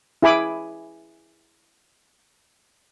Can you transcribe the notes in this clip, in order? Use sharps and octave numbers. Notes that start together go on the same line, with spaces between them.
E4 G#4 G#5 B5 D6